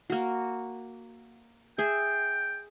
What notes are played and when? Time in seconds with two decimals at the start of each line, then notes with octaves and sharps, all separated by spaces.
0.10 A#3 F#4
1.78 G#4 E5 G5